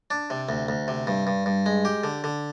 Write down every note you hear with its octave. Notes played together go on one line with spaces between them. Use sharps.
D4
C3
D2
D2
C3
G2
G2
G2
G#3
G4
D3
D3